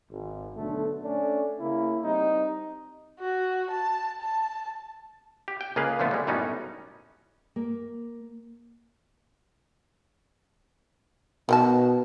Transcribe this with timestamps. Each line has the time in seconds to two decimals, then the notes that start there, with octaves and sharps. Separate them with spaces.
0.11 G#1
0.57 B1 D3 A3
1.03 A3 C#4 D4
1.60 C#3 A#3 E4
2.04 G3 C4 D#4
3.19 F#4
3.71 A5
4.21 A5
5.48 G4
5.61 G5
5.76 C#2 A#3 G#4 B4 F5
5.99 A#2 D3 F3 A3 B3
6.11 G3 G#3
6.27 F#2 A2 G3 B3 C#4 D#4
7.56 A#3
11.49 B2 D#3 G5 A5